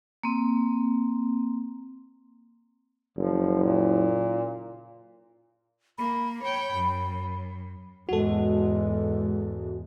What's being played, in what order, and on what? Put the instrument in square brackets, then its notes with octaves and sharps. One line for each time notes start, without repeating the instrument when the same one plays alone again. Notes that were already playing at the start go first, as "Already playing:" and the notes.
[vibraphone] A#3 C4
[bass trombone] F#1 [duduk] F3
[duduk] A#2
[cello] A#3 [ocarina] B5
[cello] C#5 G5
F#2
[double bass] E2 G#2 [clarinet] G#3 [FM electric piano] F#4 A4